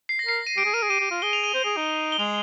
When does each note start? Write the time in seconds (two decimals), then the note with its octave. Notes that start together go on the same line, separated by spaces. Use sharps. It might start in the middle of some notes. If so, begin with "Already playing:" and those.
0.09 C7
0.19 A#6
0.26 A#4 C7
0.47 D#7
0.57 G4 D7
0.65 G#4
0.74 A#4 D#7
0.82 G#4
0.90 G4 D#7
1.00 G4
1.11 F4
1.22 G#4 G7
1.33 F7
1.44 D#7
1.54 C5
1.65 G#4
1.76 D#4
2.12 G7
2.19 G#3 F7